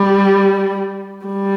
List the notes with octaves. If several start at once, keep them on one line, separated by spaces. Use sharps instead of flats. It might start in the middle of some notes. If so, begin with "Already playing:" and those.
Already playing: G3
G3